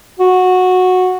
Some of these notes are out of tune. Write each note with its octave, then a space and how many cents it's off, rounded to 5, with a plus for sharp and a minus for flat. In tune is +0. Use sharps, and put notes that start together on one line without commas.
F#4 -10